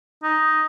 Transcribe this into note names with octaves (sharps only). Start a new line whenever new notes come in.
D#4